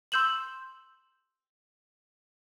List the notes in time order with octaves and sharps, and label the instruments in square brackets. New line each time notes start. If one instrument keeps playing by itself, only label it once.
[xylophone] C6 E6 G6 E7 F#7